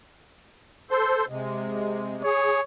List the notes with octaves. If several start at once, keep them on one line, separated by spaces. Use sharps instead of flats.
A4 C5 C6
C3 G#3
G#4 C#5